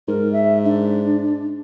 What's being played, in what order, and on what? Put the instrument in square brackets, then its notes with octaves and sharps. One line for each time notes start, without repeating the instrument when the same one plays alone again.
[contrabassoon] G#2 [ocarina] A#4
[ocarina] E5
D4